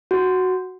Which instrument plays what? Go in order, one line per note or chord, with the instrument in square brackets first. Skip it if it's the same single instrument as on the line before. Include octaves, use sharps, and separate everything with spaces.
[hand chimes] F#4